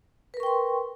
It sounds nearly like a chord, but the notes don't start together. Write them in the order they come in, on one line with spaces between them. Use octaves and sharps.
B4 A#4 C#6 G5 C6